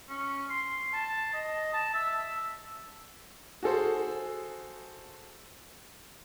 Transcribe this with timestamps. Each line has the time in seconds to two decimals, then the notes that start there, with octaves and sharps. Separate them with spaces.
0.09 C#4
0.50 C6
0.93 A5
1.34 D#5
1.73 A5
1.94 E5
3.63 F#4 G#4 A4 C5